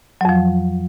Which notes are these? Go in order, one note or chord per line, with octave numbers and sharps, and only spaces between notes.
F2 F3 F#3